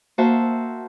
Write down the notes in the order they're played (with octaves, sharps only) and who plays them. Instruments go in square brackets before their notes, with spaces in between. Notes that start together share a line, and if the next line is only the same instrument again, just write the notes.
[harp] A#3 F#4 C5 E5 A5